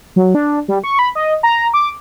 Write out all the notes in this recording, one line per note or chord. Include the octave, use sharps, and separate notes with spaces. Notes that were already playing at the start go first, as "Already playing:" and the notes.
F#3
D4
G3
C#6
B5
D#5
A#5
D6